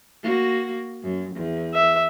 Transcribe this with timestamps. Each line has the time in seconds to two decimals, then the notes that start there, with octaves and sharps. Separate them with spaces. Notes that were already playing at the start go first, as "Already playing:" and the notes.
0.22 A#3 F#4
1.02 F#2
1.36 E2
1.74 E5